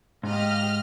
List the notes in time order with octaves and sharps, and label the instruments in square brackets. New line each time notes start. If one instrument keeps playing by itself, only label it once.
[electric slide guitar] G#2 [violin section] G4 D#5 F5 [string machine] F6